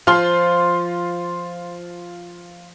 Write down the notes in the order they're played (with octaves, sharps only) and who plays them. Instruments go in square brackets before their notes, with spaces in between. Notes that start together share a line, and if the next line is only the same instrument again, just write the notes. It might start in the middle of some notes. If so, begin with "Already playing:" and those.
[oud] F3 [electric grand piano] F4 [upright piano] C6 F6